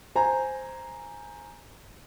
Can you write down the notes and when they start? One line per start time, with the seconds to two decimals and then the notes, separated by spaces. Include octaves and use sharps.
0.15 C5 G#5 A#5